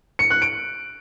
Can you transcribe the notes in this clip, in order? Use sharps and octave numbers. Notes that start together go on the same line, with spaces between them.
C#7
F#6
D7